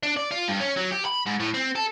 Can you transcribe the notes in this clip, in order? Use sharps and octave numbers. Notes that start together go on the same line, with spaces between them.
D4
D5
F4
G2
C#4
F#3
G4
B5
G#2
A2
C4
A4